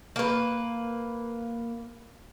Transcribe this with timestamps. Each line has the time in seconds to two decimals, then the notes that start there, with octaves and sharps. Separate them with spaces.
0.16 A#3 B4